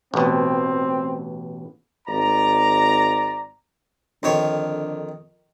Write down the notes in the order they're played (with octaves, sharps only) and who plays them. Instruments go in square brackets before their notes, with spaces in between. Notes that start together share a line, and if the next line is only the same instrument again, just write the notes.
[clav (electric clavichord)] A1 B2 [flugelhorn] C4
[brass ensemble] G#1 D5 A#5
[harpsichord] F2 D#3 C#5 [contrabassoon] D3